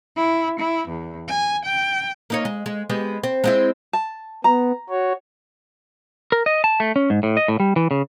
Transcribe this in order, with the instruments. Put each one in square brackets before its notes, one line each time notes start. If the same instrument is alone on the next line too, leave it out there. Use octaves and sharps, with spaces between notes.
[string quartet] E4
E4
E2
G#5
G5
[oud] A#3 D#4 C#5
G#3
G#3
G#3 B3 G4
C4
G#3 C4 E4
[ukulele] A5
[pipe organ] B3 [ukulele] A#5
[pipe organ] F#4 C#5
[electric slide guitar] A#4
D#5
A5
A3
C#4
G#2
A2
D#5
A2
G3
E3
C#3